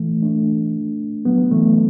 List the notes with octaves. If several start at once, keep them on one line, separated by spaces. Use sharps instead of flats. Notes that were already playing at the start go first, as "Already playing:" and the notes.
Already playing: E3 A3
A3 D4
F#3 B3
E3 A3